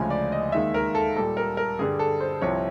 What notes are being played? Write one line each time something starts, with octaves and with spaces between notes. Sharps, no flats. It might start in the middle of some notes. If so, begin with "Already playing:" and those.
Already playing: D2 C#3 F3 G#3 G#5
D5
D#5
D#2 D#3 G#3 E5
A#4
A4
A#2 G3 A4
A#4
A#4
G2 D3 G3 G#4
A4
C5
C2 C3 F3 C#5